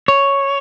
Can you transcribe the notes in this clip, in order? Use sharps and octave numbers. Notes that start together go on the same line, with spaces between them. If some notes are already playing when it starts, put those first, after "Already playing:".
C#5